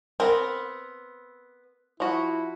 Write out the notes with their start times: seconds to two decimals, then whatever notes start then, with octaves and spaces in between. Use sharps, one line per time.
0.20 B3 C4 A#4
2.00 F3 E4 F#4